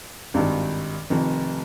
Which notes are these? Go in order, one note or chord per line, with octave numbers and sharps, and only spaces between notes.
G#1 G2 D#3
F1 F2 D#3